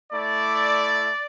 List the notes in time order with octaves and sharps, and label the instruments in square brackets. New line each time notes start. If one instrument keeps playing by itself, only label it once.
[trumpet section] A3 E4 D5